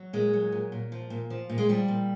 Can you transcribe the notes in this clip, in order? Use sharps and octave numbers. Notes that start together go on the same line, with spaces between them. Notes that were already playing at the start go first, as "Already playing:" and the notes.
Already playing: F#3
A#2 G#3
F#3
A#2
A#2
F3
A#2
F3
A#2
G#3
F3 G3
A#2